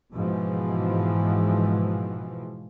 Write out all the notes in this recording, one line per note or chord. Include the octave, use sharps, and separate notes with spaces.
G#2 B2 E3 F3